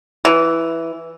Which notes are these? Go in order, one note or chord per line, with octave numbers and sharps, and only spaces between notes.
E3